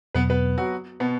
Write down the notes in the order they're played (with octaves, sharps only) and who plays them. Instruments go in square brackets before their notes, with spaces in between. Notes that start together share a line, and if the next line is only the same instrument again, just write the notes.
[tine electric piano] E2 B2 F#3 [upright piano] B3 B4
[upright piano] B3 B4
F#3 F#4
B2 B3